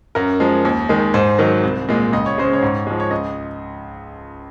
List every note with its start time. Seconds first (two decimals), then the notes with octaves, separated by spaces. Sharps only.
0.15 F#2 A#4
0.40 F3 G#3
0.65 D#2
0.89 D#3 G#3
1.14 G#2 C5
1.39 D#3 F#3
1.63 C2
1.89 A#2 G#3
2.13 C#2 D#5
2.26 C#5
2.38 C#3 G#3 C5
2.53 C#5
2.62 G#2
2.87 F3 G#3
3.00 C#5
3.11 C#2 D#5